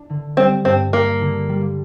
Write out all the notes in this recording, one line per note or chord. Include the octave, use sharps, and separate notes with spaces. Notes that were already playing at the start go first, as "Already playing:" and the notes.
Already playing: D4
D3
G3 C4
G2 C4
A#3 D4
D3
G3